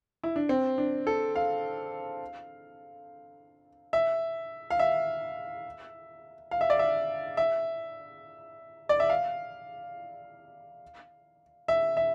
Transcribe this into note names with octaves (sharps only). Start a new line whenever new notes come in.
E4
D4
C4
D4
A4
F5
E5
F5
E5
F5
E5
D5
E5
E5
D5
E5
F5
E5
E5